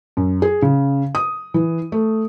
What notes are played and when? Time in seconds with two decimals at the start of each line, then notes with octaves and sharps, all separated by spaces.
0.17 F#2
0.42 G#4
0.62 C#3
1.15 D#6
1.54 E3
1.92 A3